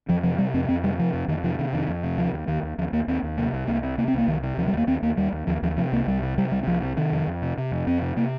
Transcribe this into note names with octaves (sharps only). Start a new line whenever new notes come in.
F2 F3
C3 F3
C3 G3
F2 C4
F2 C4
C3 G3
C3 F3
F2
F2 D#3
C3 F3
C3 D#3
F2 D#3
F2
C3
D#2 F3
D#2
D#2 D#3
D#2
D#2 F3
D#2 A#3
D#2 C4
D#2
C3 A#3
C2
C2 A#3
C3
C3 A#3
C4
C2 A#3
C2 D#3
C3
D#2 F3
G3
D#2 A#3
D#2 C4
D#2 A#3
D#2 G3
D#2
D#2 F3
D#2 F3
C3 F3
C2 A#3
C2 G3
C3
C3 G3
C2 G3
C2 F3
C3
C3 D#3
F2
F2
C3
C3
F2
F2 C4
C3
C3 A#3